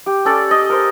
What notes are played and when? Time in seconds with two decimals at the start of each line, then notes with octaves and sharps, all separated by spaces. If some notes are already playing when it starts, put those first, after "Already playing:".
0.06 G4
0.25 C#4 A4 D5
0.51 D#5
0.70 A#4 C5